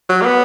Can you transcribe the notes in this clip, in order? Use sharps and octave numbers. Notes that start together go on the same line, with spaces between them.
F#3
A#3
B3